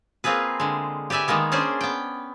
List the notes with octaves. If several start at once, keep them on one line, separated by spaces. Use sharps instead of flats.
A#3 C4 F4 G#4 B4
D3 G#3
G4 B4 D5 E5 G#5
D#3 G#3 A#3 B3
C#4 D4 G#4 C5 D5
B3 G5